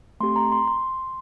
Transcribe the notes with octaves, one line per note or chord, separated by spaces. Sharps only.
A3 C4 G4 C6
A#5
C6
C6